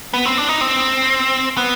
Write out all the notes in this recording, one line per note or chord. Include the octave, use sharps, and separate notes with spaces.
B3
C4
D4
D#4
C4
B3